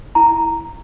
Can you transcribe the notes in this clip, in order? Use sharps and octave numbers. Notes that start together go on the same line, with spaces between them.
E4 A#5
A#5